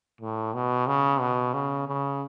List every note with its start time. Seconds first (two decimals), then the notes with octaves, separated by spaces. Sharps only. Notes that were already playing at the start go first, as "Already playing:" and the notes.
0.21 A2
0.54 B2
0.87 C#3
1.20 B2
1.54 C#3
1.88 C#3